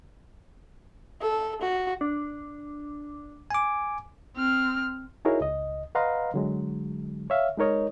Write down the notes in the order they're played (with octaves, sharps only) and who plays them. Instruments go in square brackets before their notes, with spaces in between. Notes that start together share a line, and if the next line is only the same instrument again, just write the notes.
[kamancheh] A4
F#4
[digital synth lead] D4
[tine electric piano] G#5 D6
[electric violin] C4 F6
[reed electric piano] D#4 E4 F#4 G#4 A#4 C#5
C#2 D#5
B4 D#5 F5 F#5 A#5 C6
D3 F#3 G#3
C#5 E5 F5
G#3 D#4 A#4 C#5 D#5